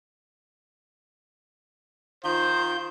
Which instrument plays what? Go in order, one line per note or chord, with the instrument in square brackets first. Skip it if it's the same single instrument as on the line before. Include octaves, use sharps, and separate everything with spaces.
[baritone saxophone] D#3 [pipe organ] F4 G6 [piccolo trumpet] C5